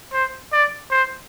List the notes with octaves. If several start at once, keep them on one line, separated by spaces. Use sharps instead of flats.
C5
D5
C5